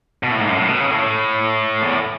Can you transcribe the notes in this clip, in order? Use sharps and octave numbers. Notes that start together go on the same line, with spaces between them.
B2
A2
G#2
F#2
A2
B2
C#3
A2
E2